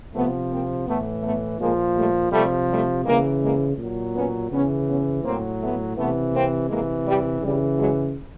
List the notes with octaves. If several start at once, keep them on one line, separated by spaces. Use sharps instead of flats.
C3 F3 A3 B3
A#3 C4
A2 E3 A3 B3
A3 B3
A#2 F3 G#3 A#3
G3 A3
C3 F3 G3 A3
G3 A3
C#3 E3 G#3 A#3
G#3 A#3
A#2 F#3
B3 C#4
C#3 E3 B3 C#4
B3 C#4
A2 F#3 A#3 C4
A3 B3
C3 E3 A3 B3
A#3 C4
C3 E3 G#3 A#3
G3
C#3 E3 G3
F#3 G#3